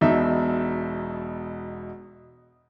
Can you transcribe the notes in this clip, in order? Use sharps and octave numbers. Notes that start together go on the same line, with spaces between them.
E1 B2 D#4 E5